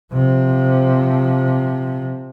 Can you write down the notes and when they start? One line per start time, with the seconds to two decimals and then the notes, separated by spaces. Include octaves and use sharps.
0.13 C3 F3